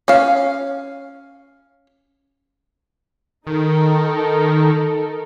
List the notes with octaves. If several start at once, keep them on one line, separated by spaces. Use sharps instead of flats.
C#4 F5
D#3 D#4 A4 A#4